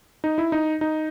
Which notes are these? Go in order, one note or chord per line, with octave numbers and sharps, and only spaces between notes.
D#4
E4
D#4
D#4